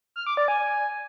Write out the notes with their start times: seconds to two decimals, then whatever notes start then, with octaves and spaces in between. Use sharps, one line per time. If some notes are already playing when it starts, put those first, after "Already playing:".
0.16 F6
0.27 D6
0.37 D5
0.48 G#5